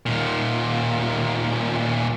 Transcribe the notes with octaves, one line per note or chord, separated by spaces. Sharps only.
D#2 A#2